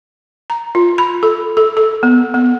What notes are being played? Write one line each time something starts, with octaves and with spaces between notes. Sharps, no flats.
A#5
F4
B5
A4
A4
A4
B3
B3